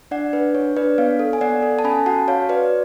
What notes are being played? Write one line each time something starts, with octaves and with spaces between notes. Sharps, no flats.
D4 D5 F#5
D4 B4
D4 C#5
D4 B4 D5
B3 C#5 F5
A4
G#5
B3 D5 F#5
A4
A5
C#4 G#5 B5
F#4 F#5 A5
F#4 C#5 F5
F#4 B4 D5